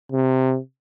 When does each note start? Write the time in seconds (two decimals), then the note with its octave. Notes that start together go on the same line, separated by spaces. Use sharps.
0.12 C3